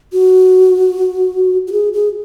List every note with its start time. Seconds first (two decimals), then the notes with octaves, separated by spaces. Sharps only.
0.13 F#4
1.67 F#4
1.72 G#4
1.93 G#4